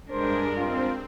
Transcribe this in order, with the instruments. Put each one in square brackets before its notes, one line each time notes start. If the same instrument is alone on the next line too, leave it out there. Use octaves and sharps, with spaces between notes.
[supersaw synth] G2 G#3 [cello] D4 A#4 [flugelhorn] C5
[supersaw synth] C4 [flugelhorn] F4